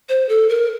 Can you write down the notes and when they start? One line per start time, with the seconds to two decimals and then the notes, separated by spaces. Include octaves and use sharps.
0.09 C5
0.29 A4
0.49 A#4